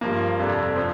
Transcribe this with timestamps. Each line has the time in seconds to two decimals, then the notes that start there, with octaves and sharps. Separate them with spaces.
0.01 G2 F3 A#3
0.39 F2 C3 G3 D4 A4
0.76 F3 C4